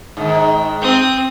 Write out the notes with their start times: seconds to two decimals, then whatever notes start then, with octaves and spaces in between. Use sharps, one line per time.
0.17 G#2 D#3
0.81 C4 D#6